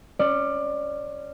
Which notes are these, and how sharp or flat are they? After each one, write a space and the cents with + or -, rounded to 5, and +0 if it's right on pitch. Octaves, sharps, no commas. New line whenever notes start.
C#4 +0 D5 +20